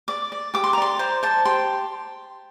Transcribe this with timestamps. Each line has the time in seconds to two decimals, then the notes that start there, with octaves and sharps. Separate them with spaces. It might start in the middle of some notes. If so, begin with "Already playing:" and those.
0.08 D5 D6
0.32 D5
0.54 G4 D6
0.64 C6
0.73 A#5
0.78 D5 C6
0.99 C5 A#5
1.23 C5 A5
1.45 G4 C6